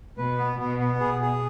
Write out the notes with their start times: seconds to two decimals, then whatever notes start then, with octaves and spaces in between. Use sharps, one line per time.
0.17 B2 B4
0.38 B3
0.59 B2 B3
0.79 B3
1.00 B2 G#4
1.21 G#4